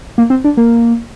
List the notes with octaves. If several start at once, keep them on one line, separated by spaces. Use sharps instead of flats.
A#3
C4
D4
A#3